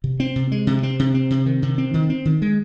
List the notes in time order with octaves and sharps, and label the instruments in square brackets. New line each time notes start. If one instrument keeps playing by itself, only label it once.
[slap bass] C3
C4
C3
G#3
C3
C4
C3
C4
C3
D#3
C3
C4
D#3
C4
D#3
G#3